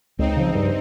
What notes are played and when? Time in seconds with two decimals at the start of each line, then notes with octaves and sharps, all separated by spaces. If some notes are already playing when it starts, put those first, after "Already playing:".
0.18 C#2 C4 D#4
0.36 C#3 F3
0.54 G2